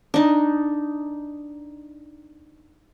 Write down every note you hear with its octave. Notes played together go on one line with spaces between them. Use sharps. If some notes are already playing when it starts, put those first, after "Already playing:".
D4 D#4